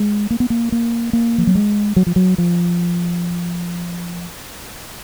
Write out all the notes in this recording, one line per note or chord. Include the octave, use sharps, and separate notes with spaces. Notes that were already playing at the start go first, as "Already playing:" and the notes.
Already playing: G#3
A#3
B3
A#3
A#3
A#3
F3
F#3
G#3
F#3
F3
F#3
F3